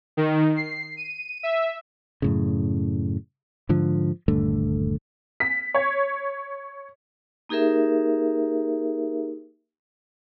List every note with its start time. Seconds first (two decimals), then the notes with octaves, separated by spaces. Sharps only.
0.17 D#3
0.56 C7
0.97 D#7
1.43 E5
2.22 F#2 A2 C#3
3.69 G#2 D3 F3
4.28 D#1 G2 D3 A3
5.40 B6
5.74 C#5
7.49 A#3 D#4 G4 G#4 A#4 E5